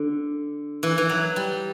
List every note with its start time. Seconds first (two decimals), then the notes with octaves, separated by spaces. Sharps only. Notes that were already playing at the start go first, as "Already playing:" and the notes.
Already playing: D3
0.83 E3
0.98 E3
1.09 F#3
1.36 G3